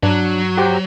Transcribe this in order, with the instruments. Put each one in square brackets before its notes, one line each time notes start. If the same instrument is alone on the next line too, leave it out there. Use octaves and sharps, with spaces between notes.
[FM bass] G2 [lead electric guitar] F#3 [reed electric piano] D4
[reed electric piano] F#4 G4 C5